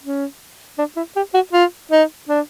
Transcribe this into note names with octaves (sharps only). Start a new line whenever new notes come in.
C#4
D4
E4
G4
F#4
F4
D#4
D4